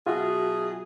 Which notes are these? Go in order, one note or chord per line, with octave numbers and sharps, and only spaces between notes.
B2 F#3 F4 F#4 G#4 E5